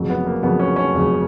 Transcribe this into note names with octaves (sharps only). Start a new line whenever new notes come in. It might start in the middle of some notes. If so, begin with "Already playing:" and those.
Already playing: F1 F2 C#3 F#3
B3
A#3
F1 F2 C#3 F#3 B3
C#4
C#4
F1 F2 C#3 F#3